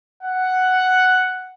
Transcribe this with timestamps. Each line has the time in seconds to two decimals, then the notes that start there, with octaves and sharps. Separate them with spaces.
0.24 F#5